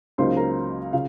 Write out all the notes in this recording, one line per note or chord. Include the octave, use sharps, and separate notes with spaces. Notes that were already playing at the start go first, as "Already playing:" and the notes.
C#2 C#3 F#3 A#3 D#4 C5 C6
A#4 A#5
C#3 F4 F5